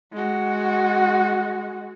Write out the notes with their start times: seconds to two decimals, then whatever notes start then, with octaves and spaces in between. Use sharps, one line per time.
0.13 G#3 F#4